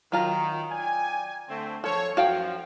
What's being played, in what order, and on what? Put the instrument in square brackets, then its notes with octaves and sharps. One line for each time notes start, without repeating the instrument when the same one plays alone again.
[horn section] D#3 [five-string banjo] F#3 F4 A#5
[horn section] D5 G5 G#5
D3 A3 C4
[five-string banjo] F3 A4 [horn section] C#5
[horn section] F#2 F3 [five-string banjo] F#4 F5 G5